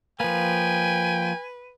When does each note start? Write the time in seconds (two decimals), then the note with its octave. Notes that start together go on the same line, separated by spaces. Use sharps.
0.20 F3 A#3 B4 G5 G#5